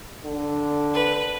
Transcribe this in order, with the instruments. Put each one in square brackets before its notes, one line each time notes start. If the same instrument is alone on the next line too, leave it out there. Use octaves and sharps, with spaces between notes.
[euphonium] D3
[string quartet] B4